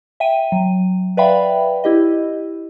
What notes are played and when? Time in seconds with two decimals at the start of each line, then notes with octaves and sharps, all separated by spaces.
0.20 E5 G5 D#7
0.52 F#3
1.17 B4 D5 E5 F5 G5 B5
1.84 E4 G4 D#5